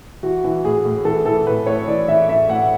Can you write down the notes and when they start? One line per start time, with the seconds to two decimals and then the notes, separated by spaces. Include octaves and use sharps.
0.23 E3 F#4
0.44 E3
0.64 A2 G#4
0.85 A2
1.05 E3 A4
1.25 E3 A4
1.47 A2 B4
1.66 A2 C#5
1.87 E3 D5
2.08 E3 E5
2.29 A2 E5
2.49 A2 F#5